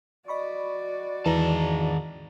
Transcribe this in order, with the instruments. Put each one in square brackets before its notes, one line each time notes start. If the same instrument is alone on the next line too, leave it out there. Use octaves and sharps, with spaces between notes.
[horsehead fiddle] F#4 D5 [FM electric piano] D#5 B5 C#6
[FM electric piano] E2 A#5 A#6 [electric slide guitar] D#3 G#4 A5 [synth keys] E3